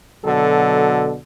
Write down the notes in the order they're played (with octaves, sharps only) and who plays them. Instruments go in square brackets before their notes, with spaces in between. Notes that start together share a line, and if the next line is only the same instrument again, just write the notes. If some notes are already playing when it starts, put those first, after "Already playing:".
[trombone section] B2 D3 F#3 A4